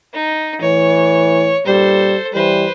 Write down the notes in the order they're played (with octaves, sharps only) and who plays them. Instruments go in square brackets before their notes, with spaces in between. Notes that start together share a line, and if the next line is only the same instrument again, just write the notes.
[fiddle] D#4
[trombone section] A2 E3 [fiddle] C#5
[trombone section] G2 A#2 G3 [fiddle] A4 C5
[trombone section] E3 G3 [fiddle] B4 C5